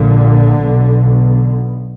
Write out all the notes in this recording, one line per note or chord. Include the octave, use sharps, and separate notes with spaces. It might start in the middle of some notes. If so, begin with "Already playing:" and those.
Already playing: A#1 A#2 D3
B1 B2